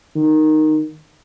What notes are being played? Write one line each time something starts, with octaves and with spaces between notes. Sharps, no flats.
D#3